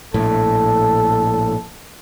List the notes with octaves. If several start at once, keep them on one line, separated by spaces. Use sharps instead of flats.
A#1 A2 A4